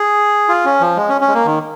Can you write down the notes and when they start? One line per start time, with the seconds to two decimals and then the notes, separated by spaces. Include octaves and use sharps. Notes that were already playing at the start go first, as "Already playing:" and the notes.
Already playing: G#4
0.49 F4
0.65 C#4
0.81 F3
0.97 G#3
1.09 C#4
1.21 C#4
1.28 G#3
1.34 A#3
1.46 D#3